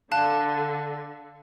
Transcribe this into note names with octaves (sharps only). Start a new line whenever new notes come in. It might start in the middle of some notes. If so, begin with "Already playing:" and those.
D3 F5 A5 F#6